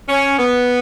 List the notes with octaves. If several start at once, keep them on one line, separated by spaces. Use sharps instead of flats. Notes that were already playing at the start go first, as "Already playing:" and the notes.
C#4
B3